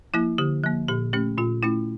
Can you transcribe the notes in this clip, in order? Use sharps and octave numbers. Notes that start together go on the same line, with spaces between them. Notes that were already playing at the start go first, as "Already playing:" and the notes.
F3 A#3 E4
D3 G4
F3 A#3
A#2 G4
A3 C#4 G4
A#2 F4
A3 C#4 E4